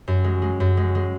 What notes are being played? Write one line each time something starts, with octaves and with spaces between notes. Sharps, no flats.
F#2
G#3
G#3
F#2
G#3
G#3